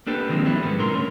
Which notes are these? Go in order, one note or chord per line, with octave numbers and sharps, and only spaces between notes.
A#3 B3 D4 G4 A4 B4
D#3 F3 F#3 G#3 B3 C4
D#3 E3 F#3 G3 C#4 E4
E2 G#2 A3 B3
A#2 D3 A#4 C6
A3 C#4